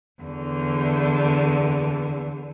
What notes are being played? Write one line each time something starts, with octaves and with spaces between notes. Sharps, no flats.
E2 D3